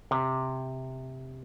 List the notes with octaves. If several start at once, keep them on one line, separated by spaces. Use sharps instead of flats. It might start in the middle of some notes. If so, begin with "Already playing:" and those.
C3